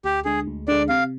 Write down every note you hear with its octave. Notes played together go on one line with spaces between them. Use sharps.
D2 G4
D3 G#3 G#4
D2
D3 G#3 D5
C3 F5